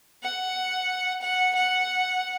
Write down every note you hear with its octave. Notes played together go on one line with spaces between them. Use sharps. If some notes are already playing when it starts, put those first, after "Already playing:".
F#5
F#5
F#5